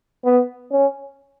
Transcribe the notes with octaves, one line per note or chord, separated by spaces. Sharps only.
B3
C#4